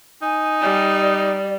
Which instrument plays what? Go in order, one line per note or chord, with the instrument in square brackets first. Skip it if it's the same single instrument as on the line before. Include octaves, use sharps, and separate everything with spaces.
[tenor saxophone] D#4 [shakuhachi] G#5
[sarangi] G3
[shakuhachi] D5